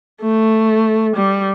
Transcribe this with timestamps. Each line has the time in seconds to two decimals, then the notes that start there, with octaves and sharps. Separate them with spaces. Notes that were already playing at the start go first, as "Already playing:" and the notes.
0.22 A3
1.16 G3